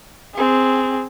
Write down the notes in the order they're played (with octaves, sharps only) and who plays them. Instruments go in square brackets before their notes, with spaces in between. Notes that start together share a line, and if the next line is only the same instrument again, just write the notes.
[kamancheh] C4 G#4